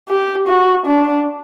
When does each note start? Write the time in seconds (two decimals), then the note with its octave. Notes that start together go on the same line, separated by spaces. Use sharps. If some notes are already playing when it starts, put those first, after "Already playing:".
0.09 G4
0.48 F#4
0.87 D4